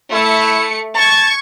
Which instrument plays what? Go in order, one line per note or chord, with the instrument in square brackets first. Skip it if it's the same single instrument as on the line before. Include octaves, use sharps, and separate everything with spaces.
[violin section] A3 C#7 [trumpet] E4
[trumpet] A5 [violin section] C#6 G#6